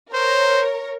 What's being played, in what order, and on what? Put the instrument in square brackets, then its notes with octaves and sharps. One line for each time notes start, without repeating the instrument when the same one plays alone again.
[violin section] A#4 C#5 [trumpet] C5